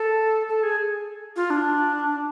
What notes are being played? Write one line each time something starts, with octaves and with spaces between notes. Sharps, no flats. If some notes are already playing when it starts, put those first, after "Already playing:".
Already playing: A4
A4
G#4
F4
D4